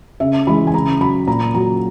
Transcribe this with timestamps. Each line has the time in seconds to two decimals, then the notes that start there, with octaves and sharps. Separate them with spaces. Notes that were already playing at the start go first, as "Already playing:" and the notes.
0.20 C#3 E5
0.47 E3 G#3 B5
0.67 G#5
0.74 C#3 A#5
1.01 F#3 B5
1.27 A#2 A#5
1.54 F#3 A#5